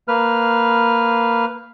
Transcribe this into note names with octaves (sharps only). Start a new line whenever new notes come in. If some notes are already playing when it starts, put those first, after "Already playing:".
A#3 B4 F6